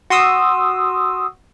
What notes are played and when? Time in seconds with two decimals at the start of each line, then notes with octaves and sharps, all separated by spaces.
0.10 F#4 C6 D#6 E6